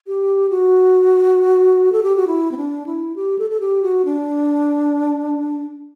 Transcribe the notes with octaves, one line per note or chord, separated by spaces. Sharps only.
G4
F#4
A4
G4
F#4
E4
C4
D4
E4
G4
A4
A4
G4
F#4
D4